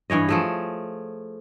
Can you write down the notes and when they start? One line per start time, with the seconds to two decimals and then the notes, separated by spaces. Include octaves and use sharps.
0.10 G2 E3 C#5 D#5
0.29 F3 A3 G#4